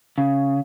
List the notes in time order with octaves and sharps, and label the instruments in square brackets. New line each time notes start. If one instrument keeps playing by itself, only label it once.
[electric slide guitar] C#3